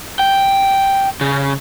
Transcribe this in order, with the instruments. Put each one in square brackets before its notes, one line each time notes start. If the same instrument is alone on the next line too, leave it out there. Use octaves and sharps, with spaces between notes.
[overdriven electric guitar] G5
C#3